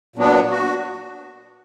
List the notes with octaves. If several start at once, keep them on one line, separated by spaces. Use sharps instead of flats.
A#2 F#3 B3 D4
F#4